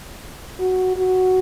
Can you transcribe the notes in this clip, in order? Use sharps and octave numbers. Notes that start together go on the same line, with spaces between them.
F#4
F#4